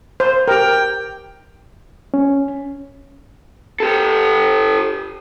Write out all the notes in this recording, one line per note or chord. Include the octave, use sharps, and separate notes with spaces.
C5
G4 A#4 G5
C#4
G4 A4